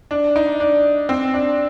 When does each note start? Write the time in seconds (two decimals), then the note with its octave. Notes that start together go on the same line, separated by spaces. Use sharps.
0.11 D4
0.36 D#4
0.60 D4
1.09 C4
1.34 D4